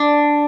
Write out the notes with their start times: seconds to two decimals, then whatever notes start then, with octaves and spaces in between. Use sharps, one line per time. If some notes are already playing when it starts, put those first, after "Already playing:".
Already playing: D4